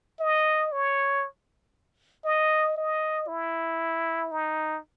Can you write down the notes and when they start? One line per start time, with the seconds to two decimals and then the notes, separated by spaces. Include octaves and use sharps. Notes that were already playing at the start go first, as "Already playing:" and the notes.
0.20 D#5
0.72 C#5
2.25 D#5
2.77 D#5
3.28 E4
4.32 D#4